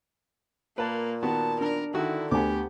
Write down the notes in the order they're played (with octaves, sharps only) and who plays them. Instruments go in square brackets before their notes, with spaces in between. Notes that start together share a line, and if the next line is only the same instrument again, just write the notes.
[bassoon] A#2 [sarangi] A#3 [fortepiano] B4 A5
[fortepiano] D#3 B3 F#4 [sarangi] A5
[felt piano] D4 [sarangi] A#4
[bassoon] D3 [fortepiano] D#3 F#4 [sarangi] E4
[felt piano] D2 G#5 [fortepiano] B3 D6 [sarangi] G4